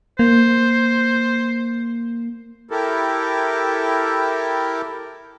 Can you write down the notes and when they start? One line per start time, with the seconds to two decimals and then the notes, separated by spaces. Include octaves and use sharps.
0.19 A#3 C5
2.71 E4 G4 A4 A#4